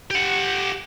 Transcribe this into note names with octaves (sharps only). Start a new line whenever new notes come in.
G4 F#5